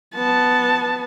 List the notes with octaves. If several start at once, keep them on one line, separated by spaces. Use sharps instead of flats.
B3 A5